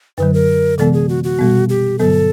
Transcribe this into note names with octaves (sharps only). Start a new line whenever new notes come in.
F#2 D3 F#3 B4
A#4
C3 E3 G#3 B3 A4
G#4
F#4
F#4
B2 G3 B3
G4
G2 D3 F#3 B3 A4